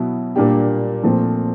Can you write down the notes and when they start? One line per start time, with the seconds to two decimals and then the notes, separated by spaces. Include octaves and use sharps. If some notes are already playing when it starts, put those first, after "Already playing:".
Already playing: B2 F#3 B3 E4
0.35 A#2 G3 A#3 D4 G4
1.03 A#2 F3 A3 C4